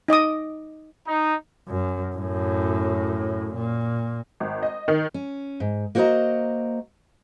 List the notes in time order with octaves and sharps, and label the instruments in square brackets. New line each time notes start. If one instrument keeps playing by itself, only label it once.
[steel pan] D#4 D#5 D6 D#6
[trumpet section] D#4
[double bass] F#2
F#2 A2
A#2
[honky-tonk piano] G#1
D#5
D#3
[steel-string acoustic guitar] C#4
G#2
A#3 F#4 C5 C#5 D#5 A#5